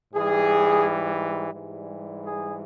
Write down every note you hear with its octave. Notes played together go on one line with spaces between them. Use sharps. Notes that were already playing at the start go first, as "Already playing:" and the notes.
G#2 E3 G3 G#4
G#2 E3 G3
G#4